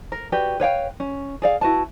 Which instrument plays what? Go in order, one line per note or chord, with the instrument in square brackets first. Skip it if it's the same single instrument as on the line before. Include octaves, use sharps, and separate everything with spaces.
[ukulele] A#4
F#4 G4 B4 D5
B4 C#5 F5 G5
C#4
G#4 D5 F5
E4 F#4 B4 A5